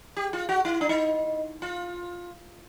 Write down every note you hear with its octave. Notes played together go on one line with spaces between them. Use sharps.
G4
F4
F#4
E4
D4
D#4
F4